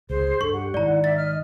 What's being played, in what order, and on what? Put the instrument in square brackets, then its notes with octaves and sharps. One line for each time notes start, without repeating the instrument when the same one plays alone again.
[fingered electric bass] C#2 [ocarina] G#4 [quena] C5
[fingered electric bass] G2 [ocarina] A4 [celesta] C#6
[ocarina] G4 [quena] F#5
[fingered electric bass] G#2 D#3 [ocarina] E4 [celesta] D5 A#5
[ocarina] D5 [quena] E5 [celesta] A6
[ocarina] D#5 [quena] F6